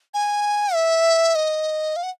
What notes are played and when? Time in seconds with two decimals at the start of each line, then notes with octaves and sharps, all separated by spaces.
0.14 G#5
0.74 E5
1.35 D#5
1.96 F5
2.03 F#5